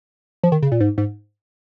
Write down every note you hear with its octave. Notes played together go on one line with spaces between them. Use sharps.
F3
D#3
C#3
A#2
G#2
G#2